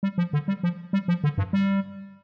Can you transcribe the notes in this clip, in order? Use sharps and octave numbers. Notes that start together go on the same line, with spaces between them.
G3
F3
D3
G3
F3
G3
F3
D3
G2
G3